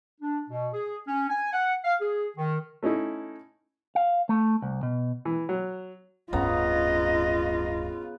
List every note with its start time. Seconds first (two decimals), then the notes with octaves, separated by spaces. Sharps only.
0.21 D4
0.50 B2
0.74 G#4
1.08 C#4
1.30 G#5
1.53 F#5
1.84 F5
2.01 G#4
2.37 D#3
2.83 A3 C#4 D#4 E4
3.95 F5
4.29 A3
4.62 C2
4.83 B2
5.25 E3
5.49 F#3
6.33 D1 G2 C#3 B3 F4 D#5 A#5